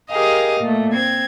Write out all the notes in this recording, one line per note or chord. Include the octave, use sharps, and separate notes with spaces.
G4 G#4 A#4 D#5 F5
A#2 A3
C4 G#6